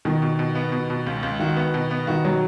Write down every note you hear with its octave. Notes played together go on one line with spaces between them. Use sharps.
B2 D#3
B2
B2
B3
B2
B2
C#2
C#2
D#3 F#4
B3
B2
B3
D#3 F#4
B2 F#3